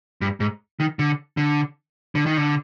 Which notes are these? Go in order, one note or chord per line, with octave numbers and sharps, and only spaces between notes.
G2
G#2
D#3
D3
D3
D3
D#3
D3